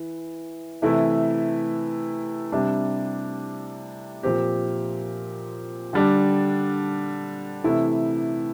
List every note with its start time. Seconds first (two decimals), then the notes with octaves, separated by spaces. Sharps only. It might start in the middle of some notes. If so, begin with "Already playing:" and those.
Already playing: E3
0.82 C3 E3 A3 E4
2.52 C3 G3 D4
4.23 A#2 F3 C4 G4
5.93 D3 G3 D4
7.64 C3 E3 A3 E4